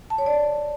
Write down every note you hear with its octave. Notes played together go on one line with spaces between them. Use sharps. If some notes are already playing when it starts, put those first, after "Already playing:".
A5
C#5
D5